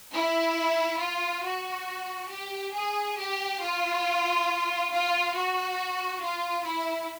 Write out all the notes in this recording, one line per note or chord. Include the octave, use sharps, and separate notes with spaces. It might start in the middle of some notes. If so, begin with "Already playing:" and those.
E4
F4
F#4
G4
G#4
G4
F4
F4
F#4
F4
E4